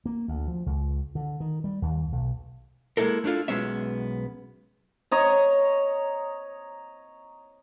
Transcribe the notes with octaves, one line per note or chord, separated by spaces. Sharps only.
A#3
D2
F3
C#2
D3
D#3
G3
D#2
B1
G#3 A#3 D#4 E4 A4 A#4
A3 D4 E4 F4 A4
B1 B2 G#3 B3 C#4 E5
C#5 D#5 A#5